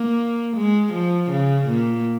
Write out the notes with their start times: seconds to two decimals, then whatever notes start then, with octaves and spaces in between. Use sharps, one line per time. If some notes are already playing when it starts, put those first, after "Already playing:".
Already playing: A#3
0.56 G#3
0.93 F3
1.31 C#3
1.67 A#2